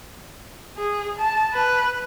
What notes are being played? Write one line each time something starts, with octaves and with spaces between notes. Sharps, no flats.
G#4
A5
B4